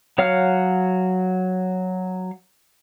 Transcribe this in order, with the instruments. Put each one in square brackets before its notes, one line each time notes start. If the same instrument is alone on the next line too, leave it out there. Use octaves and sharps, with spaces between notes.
[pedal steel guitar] F#3 C#5 F5 F#5 F6